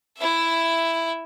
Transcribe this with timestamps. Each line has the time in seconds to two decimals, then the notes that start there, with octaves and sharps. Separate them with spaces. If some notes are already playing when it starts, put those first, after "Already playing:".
0.18 E4 E5